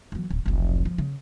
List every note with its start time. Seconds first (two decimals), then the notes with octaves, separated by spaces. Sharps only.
0.12 E3 F#3
0.31 D1
0.46 F1 B1
0.85 F3
0.98 C#3